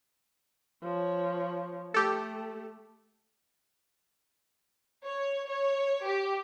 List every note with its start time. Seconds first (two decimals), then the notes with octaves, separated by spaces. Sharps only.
0.83 F3 C#5
1.94 A3 G4 A4
5.05 C#5
5.48 C#5
6.05 G4